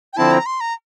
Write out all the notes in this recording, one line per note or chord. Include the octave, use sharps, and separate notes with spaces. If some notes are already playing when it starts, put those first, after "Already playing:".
G5
D3 F3 C4 E4 A5
A#5
C6
A#5